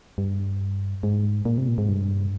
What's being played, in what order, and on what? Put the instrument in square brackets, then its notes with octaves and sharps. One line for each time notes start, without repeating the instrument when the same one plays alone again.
[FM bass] G2
G#2
A#2
C3
A#2
G#2
G2